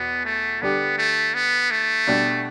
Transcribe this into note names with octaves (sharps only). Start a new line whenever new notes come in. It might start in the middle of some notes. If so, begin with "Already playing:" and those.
Already playing: E2 B2 B3
A3
D3 G3 B3 D4 G4
A3
B3
A3
B2 G3 D4 G4